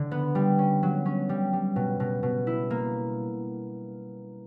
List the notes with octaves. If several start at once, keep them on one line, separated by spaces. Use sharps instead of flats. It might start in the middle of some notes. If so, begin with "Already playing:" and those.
Already playing: D3
B3
G3
C#4
F#3
C#4
G3
G3
B2
B2
B2
E4
A#3